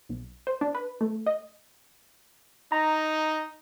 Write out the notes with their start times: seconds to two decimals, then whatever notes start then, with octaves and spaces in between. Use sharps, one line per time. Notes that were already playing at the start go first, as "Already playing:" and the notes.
0.09 B1
0.47 C5
0.61 D4
0.75 B4
1.01 A3
1.26 D#5
2.72 D#4 A#5